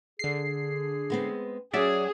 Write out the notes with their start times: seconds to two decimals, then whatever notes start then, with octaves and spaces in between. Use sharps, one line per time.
0.19 D3 G#4 C7
1.10 G#3 B3 C4
1.73 F#3 C#4 F#4 G#4 D5 E5